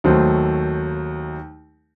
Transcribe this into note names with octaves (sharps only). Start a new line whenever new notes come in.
D#2 F#3 A3 C5